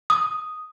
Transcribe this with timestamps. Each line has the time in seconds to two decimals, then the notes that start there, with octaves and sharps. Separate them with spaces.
0.10 D#6